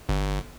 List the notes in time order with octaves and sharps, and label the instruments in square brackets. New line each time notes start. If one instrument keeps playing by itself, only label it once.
[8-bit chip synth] G1